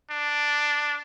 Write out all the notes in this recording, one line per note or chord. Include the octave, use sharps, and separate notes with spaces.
D4